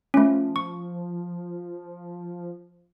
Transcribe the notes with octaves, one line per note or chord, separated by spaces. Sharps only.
F3 A3 C#4
C#6